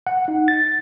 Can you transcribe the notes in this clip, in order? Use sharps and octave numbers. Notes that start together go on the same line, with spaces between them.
F#5
D#4
A6